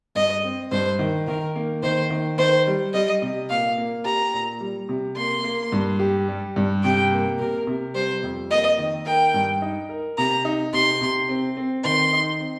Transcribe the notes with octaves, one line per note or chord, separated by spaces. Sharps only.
G2 D#5
C4
G2 C5
D#3
D#3 A#4
A#3
D#3 C5
D#3
D#3 C5
G3
G3 D#5
C3
A#2 F5
A#3
G4 A#5
A#2
G3
C3
A#3 C6
A#3
G2
G4
G3
G2
C3 G5
A#3
C3 A#4
C3
G3 C5
F2
A#3 D#5
D#3
A#4 G5
G2
D#4
A#4
C3 A#5
D#4
C3 C6
C3
C4
C4
D#3 C6
D#4
C4